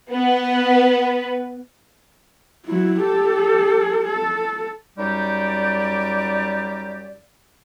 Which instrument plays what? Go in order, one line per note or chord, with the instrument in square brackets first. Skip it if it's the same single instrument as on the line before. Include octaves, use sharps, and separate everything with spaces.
[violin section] B3 B4
[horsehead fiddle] F#3 E4
G4 A4
A4
[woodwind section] F#2 G3 D#4 G4 D5